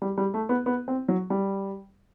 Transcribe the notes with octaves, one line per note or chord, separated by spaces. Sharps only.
G3
G3
A3
B3
B3
C4
F#3
G3